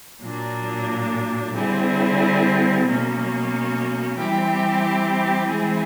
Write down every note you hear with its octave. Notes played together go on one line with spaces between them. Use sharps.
A#2 F#3 A#3 D4
D3 G3 C4 E4 G#4
B2 F#3 A#3 C#4
E3 G3 C4 E4 G4
E3 G#3 C4 E4 G#4